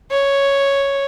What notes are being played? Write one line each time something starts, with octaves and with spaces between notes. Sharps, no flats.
C#5